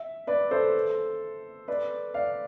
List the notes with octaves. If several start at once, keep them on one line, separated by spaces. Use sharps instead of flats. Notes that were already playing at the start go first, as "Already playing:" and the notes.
Already playing: E5
B4 D5
A4 C5
B4 D5
D5 F5